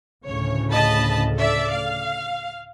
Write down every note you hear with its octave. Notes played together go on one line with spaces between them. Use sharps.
D2 A2 C#3 C#5
D#5 A5 B5
A4 D5 E5
F5